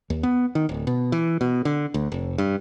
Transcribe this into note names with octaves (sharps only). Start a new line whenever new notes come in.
D#2
B3
D#3
D1
B2
E3
B2
D3
D2
F1
G2